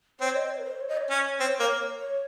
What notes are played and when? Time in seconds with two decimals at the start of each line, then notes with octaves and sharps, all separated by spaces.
0.20 C4 C#5
0.36 D#5
0.50 C#5
0.58 A#4
0.65 C5
0.81 C#5
0.89 D#5
0.97 C#5
1.10 C#4
1.40 C4
1.60 A#3
1.99 C#5